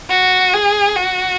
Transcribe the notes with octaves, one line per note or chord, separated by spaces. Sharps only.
F#4
G#4
F#4